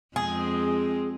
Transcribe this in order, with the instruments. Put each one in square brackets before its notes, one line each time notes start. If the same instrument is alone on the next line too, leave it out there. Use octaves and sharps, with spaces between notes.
[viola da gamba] F2 G#3 C4 [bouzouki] G#4